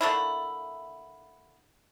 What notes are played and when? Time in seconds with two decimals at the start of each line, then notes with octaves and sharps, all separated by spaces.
0.01 D3 A3 A#3 E4